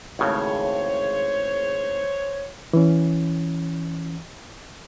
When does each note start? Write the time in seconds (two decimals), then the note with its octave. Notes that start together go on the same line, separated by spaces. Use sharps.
0.19 G#1 A2 C#3 C5 C#5
2.73 E3 C#4